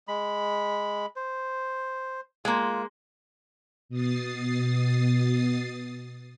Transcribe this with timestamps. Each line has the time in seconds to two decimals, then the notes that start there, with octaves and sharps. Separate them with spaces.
0.08 G#3 B5
1.16 C5
2.45 G#3 A#3 F4
3.89 B2 D#6 A6 C7